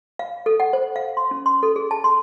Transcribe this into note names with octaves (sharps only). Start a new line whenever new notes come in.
F5
A4
F#5
C5
F5
C6
C#4
C6
A4
G#4
A5
C6